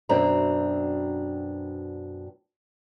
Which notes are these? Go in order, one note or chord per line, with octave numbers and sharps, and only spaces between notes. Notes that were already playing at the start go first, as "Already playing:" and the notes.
F#2 B2 C4 D4 A#5